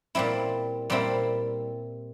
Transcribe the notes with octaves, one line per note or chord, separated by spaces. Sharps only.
A#2 G3 C4 E4
A#2 G3 C4 E4